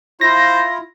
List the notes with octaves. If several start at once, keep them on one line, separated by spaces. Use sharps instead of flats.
E4 F4 C5 A#6